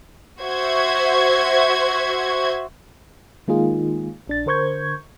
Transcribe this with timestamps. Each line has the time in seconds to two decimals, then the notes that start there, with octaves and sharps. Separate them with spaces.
0.42 F#4 C5 E5 G#6
3.48 D#3 G#3 A#3 D#4 F4 G#4
4.27 A#1 D4 A6
4.46 D3 A#4 C5 C#6 G6 G#6